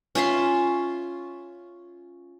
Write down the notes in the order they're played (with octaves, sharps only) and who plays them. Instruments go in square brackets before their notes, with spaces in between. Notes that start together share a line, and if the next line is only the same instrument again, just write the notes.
[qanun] C#4 F4 E5 C6